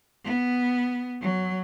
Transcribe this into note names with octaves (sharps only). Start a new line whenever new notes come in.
B3
F#3